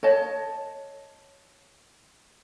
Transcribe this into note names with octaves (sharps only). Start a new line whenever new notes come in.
C#5 D#5 A5